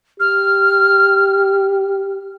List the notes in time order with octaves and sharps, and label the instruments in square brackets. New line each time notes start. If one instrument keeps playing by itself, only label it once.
[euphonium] G4 [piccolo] F6